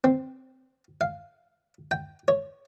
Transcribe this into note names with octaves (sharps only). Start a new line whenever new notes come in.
C4
F5
G5
C#5